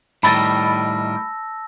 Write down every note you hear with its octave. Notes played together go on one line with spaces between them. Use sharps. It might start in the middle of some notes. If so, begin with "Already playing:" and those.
A2 D#3 G3 A5 B5 E6 A6 A#6